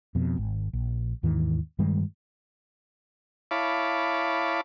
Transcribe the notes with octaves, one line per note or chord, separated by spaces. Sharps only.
F2 B2
G#1
A#1
D#2 G#2 D#3 E3
G2 D#3 G3 G#3
E4 C#5 F5 A5 B5 D6